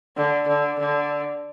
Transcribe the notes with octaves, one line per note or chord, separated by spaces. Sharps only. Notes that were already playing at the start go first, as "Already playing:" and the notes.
D3
D3
D3